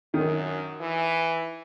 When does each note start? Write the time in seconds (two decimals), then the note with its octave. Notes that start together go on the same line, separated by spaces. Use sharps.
0.14 F#2 D#3
0.81 E3